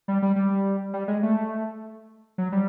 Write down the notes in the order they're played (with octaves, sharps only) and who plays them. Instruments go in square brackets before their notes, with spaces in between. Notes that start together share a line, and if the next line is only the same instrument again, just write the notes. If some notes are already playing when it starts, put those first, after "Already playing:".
[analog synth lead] G3
G3
G3
G3
G#3
A3
F#3
G3